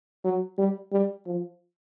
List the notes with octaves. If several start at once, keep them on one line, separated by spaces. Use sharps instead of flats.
F#3
G3
G3
F3